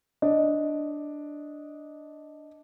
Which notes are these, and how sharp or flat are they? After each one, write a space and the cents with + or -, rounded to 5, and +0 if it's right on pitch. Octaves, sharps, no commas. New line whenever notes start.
D4 +0 D#5 +5